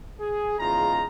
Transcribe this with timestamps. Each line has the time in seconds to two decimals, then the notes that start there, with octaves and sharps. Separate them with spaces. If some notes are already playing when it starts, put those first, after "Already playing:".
0.19 G#4
0.59 E2 C#3 G#3 D#4 F4 A#5